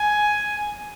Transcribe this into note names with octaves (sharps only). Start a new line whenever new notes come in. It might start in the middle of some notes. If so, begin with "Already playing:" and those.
Already playing: G#5